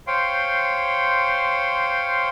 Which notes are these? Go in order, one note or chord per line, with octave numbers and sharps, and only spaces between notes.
C5 C#5 F5 G5 C6